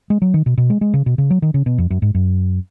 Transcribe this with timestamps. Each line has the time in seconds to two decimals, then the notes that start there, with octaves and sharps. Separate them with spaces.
0.10 G#3
0.22 F#3
0.34 D#3
0.46 B2
0.58 B2
0.70 G#3
0.81 G#3
0.94 C#3
1.06 B2
1.18 C#3
1.30 F#3
1.42 D#3
1.54 C#3
1.66 B2
1.78 F2
1.90 F#2
2.02 G#2
2.15 F#2